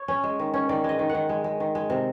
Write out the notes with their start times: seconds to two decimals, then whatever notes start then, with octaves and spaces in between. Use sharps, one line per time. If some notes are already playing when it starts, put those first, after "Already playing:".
Already playing: C#5
0.08 C#4
0.24 G#3
0.39 D#3
0.54 C#4
0.69 D#3 D5
0.84 G#3 D#5
0.99 D#3
1.09 F#5
1.15 D#3
1.29 G#3
1.44 G#3
1.60 D#3
1.75 G#3
1.90 C3